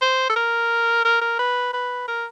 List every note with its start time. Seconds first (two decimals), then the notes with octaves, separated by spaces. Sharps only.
0.02 C5
0.30 A4
0.36 A#4
1.05 A#4
1.22 A#4
1.39 B4
1.73 B4
2.08 A#4